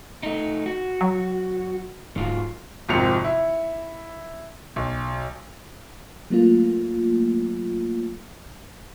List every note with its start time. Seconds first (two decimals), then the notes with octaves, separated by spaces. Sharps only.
0.23 A3 D#4
0.66 F#4
1.01 F#3
2.16 D1 G#2 F#3 F4
2.89 G#1 F2 G#2 C3 C#7 F7
3.24 E4
4.76 B1
6.30 F#3 A3 A#3 F4